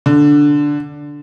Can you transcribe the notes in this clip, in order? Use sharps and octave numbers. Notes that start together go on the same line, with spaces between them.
D3